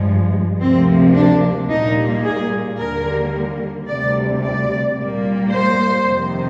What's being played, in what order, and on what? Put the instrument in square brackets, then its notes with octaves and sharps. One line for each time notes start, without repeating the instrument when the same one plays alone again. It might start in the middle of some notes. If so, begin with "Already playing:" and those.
Already playing: [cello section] G2 F3 G#3
D2 C3 F3 A#3 C4
D4
A#2 G3 A#3 D#4
G#4
D#2 D3 G3 A#3 A#4
D2 C3 G3 D5
D5
A#2 G3 A#3
C5
F2 C3 D#3